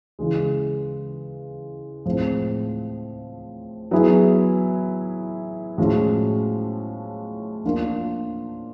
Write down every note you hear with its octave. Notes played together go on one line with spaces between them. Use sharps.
C#3 E3 G#3
A2 F3 G#3 C4
F#3 B3 E4 G#4
A2 F3 G#3 C#4 F#4
F3 A#3 D4 F4 A#4